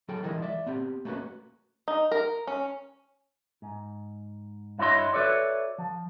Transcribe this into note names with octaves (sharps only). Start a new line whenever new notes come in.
F#3 G#4 A4 G5
E3 F3 G#3 E4 A#4
D5 E5
B3 C4 G4
A3 A#3 C#4 D#4 F#4 B4
D#4
A#4
C#4
G#2
G2 E4 F#4 C#5 D#5 C6
F#4 A4 B4 C#5 D5 E5
F3